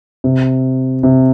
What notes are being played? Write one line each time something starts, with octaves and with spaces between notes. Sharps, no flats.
C3
C3